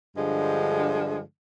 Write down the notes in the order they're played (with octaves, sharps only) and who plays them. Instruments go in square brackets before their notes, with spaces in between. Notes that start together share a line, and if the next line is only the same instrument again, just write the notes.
[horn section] G2 D3 F3 G#3